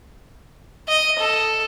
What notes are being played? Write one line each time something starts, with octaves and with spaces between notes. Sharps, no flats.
D#5
A4